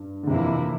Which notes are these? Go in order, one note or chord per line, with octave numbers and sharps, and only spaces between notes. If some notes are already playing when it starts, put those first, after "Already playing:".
Already playing: G2
D3
F2 C3 E3 A#3 E4